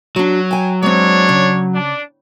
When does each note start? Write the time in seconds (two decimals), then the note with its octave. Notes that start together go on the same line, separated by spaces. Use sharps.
0.16 F#3 D4 F#4
0.51 G5 G#5
0.83 G#3 C4 D4 C#5
1.29 C#3
1.75 D4